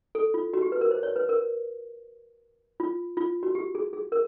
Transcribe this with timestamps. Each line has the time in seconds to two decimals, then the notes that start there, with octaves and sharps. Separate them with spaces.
0.15 A4
0.34 F4
0.53 F#4
0.62 G4
0.72 B4
0.81 A#4
0.91 C5
1.03 C#5
1.16 B4
1.29 A#4
2.80 F4
3.17 F4
3.43 F#4
3.55 G4
3.75 G#4
3.93 G#4
4.12 A#4